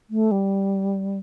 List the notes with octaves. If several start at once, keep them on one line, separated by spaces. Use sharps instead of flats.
A3
G3